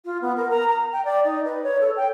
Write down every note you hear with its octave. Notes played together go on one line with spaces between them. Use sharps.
F4
B3
A#4
A#5
A#5
G5
D5
D#4
B4
C#5
A4
G5